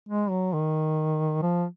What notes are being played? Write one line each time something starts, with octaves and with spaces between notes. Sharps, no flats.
G#3
F#3
D#3
F3